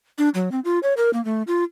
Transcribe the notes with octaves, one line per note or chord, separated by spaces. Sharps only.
D4
F#3
C4
F4
C#5
A#4
A#3
A3
F4